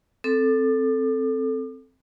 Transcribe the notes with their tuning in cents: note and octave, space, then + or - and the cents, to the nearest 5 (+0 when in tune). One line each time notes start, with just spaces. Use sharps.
C4 +0 A4 +0 D6 +40